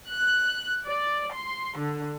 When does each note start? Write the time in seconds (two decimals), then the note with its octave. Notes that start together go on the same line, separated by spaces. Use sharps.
0.10 F#6
0.85 D5
1.35 C6
1.79 D3